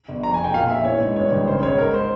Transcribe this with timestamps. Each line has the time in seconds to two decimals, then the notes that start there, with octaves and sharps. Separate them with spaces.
0.08 G1
0.23 F2 A#5
0.34 G#5
0.39 F1
0.44 G5
0.54 A#2 F5
0.70 A#1 E5
0.85 E3 C#5
1.00 G#2
1.16 G2 C#5
1.32 G#1
1.47 C#3 C5
1.63 C#2 C#5
1.78 G#2 A#4
1.94 C5